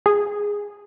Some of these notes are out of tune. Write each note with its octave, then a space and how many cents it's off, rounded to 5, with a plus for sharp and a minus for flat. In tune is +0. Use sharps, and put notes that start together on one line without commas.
G#4 -5